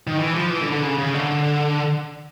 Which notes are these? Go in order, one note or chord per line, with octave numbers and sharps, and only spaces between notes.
D#3
E3
F3
E3
D3
D3
C#3
C#3
D3